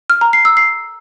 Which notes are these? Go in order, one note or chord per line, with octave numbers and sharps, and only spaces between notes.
F6
A#5
C7
E6
C7